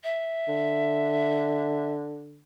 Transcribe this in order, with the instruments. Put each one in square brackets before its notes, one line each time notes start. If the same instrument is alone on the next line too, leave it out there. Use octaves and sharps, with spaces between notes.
[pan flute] E5
[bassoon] D3